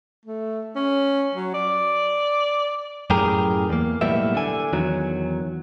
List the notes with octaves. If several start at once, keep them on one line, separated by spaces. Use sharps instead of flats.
A3
C#4
F#3
D5
F#2 A2 G4 G#4 A#4
E2 A#3
B1 A2 G3 A#3 B3 E5
D3 G#5
E2 D#3 F#3